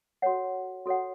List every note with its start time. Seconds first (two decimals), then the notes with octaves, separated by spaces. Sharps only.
0.22 F#4 A4 C#5 F#5
0.86 F#4 A4 C#5 F#5